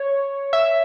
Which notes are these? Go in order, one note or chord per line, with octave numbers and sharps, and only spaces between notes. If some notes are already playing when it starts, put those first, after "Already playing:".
Already playing: C#5
E5